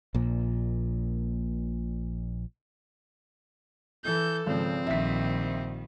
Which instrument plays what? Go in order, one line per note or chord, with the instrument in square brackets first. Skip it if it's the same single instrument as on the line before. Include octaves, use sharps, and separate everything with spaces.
[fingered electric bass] A#1 A#2
[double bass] E3 [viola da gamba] A4 [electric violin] G6
[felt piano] G#1 [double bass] C#3 F3 [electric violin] C4
[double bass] A#1 [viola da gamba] D#3 F3 G3 [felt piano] E5 B6